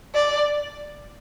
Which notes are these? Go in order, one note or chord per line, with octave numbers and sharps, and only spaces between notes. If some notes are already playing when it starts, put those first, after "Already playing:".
D5